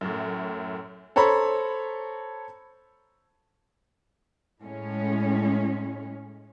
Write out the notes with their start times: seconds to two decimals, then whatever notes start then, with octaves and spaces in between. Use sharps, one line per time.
0.01 F#2 A2
1.16 A4 C5 C#5 A#5 B5
4.62 A2 G#3 C#4